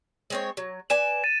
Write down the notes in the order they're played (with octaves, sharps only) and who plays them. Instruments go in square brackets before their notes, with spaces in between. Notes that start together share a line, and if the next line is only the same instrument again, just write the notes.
[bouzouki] G#3 C4 C#5
F#3
[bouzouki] B4 D5 G#5 [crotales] E7
[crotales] A6 D#7